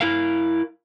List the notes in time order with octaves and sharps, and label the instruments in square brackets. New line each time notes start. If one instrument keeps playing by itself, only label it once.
[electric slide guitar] E4 A#4 F5